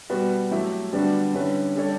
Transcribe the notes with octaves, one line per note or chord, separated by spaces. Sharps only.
B2 G3 B3 F#4 B4
F#3 A3 E4 G4
D3 G3 B3 D4 F#4
D3 G3 C#4 E4 B4
G3 D4 A4 C#5